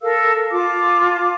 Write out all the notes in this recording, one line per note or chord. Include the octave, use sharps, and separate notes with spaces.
A4 A#4 F5 E6
F4 A5 D6